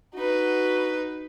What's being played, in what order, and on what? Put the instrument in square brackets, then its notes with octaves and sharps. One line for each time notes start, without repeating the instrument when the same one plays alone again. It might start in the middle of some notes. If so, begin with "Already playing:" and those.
[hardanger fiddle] D#4 B4 [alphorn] F#4